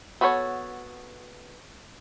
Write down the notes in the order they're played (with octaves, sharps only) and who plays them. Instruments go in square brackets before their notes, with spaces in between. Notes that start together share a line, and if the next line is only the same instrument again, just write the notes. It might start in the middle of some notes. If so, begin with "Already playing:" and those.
[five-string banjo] B3 F#4 A4 B4 C#5